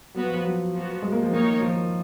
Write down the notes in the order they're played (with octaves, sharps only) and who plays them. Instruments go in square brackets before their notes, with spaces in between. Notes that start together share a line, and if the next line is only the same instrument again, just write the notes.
[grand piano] F#3 [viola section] B3 F#4 B4
[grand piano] F3
F3
F#3
[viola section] F3 B3 F#4
[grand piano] G#3
A#3
F3
[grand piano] D#3 [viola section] A#3 D#4 A#4 C#5
[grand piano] F3